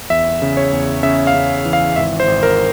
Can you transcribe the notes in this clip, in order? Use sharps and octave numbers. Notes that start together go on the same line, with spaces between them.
E2 E5
C#3
C#5
E2
C#3 E5
F5
C#3
E3
F5
G#1 E5
C5
G#1
A#4